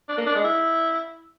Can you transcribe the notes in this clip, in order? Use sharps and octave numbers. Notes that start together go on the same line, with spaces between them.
D4
A#3
D4
G#3
E4